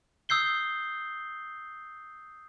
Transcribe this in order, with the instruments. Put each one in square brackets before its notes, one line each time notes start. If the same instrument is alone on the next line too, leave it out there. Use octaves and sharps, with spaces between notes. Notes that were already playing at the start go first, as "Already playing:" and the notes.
[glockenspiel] D#6 E6 G6 C7 G7